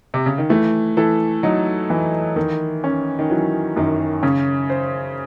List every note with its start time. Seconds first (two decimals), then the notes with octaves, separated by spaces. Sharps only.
0.14 C3
0.26 C#3
0.38 D#3
0.49 E3 A3
0.97 E3 A4
1.43 F#3 D#4
1.90 E3
2.36 D#3
2.84 C#4
3.19 D#3
3.30 E3 F#3
3.76 F#2 D#3
4.23 C#3 C#4
4.70 C5